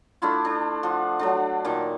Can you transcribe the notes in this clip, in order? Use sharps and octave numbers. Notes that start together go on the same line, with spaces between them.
A3 D4 E4 F4
D4
F3 F#5
F#3 A3 D4
A#2 D#3